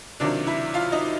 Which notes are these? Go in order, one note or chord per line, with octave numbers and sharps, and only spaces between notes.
C#2 C3 D#3 F#3 D4 D5
E4 E5
F4 F5
D#4 D#5